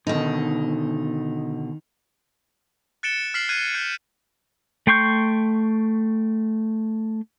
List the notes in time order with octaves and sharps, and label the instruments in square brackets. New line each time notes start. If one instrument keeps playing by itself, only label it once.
[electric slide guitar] B2 D3 [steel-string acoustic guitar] D#3 D#4
[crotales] F#6 A6 C#7 D7 E7 G7
F6 B6 C7 F#7
F6 F#6 G#6 D#7
G6 C#7
[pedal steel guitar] A3 G5 C6 C#6 G6